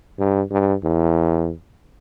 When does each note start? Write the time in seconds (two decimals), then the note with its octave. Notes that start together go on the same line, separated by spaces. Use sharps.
0.19 G2
0.51 G2
0.84 E2